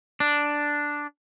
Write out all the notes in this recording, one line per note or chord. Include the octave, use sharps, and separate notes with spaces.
D4